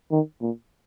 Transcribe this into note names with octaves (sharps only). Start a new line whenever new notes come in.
D#3
A#2